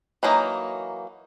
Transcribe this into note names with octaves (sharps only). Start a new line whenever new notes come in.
E3 F#3 A#3 D#4